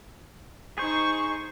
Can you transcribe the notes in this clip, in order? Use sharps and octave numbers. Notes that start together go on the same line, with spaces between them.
D#4 G#4 C5 C#6